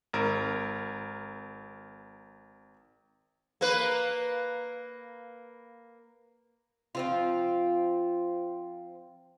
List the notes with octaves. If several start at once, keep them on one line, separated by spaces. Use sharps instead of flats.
G#1 A#4
A#3 B4
F3 C4 F4